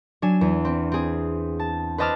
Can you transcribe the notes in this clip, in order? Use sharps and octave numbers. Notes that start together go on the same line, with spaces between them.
F#3 D4 G#5 E7
E2
C4
C4 G#4
A5
B4 C5 D#5 A5 D6 F6